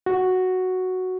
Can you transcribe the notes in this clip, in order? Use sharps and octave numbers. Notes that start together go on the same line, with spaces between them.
F#4